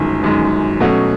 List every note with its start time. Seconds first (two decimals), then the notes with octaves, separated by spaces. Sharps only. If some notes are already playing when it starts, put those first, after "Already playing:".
Already playing: G1 F#2 D#3 G#3
0.23 G1 F#2 D#3 G#3
0.80 B2 F#3 A3 C#4 F#4